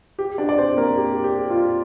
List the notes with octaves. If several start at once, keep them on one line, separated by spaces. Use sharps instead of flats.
G4
D4 D5
D5
C4 C5
A#3 A#4
G4
G4
F4